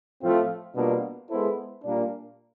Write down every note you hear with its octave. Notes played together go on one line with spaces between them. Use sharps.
A2 F3 A3 C4 F4
B2 G3 A#3 D4 F4
G#3 B3 E4 A4 C5
A#2 G3 A#3 D4